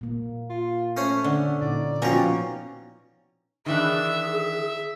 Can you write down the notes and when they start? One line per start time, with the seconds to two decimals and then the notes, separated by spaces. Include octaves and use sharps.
0.01 A#2 A#3
0.49 F4
0.97 A3 C#4 C5 C#5
1.24 D3
1.61 A#2 D#4 E4 D5
2.02 B2 F3 C#4 G5 A#5
3.66 D#3 E3 D4 G#4 E5